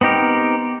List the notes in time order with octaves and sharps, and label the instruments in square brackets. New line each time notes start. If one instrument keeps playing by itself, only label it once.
[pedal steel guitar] B3 C4 D#4 G4 A#4